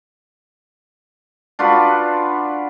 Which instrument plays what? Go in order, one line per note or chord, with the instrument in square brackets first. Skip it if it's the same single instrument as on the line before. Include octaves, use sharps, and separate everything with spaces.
[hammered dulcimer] D4 F4 F#4 B4